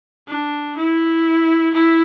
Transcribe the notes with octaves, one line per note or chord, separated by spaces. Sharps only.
D4
E4
E4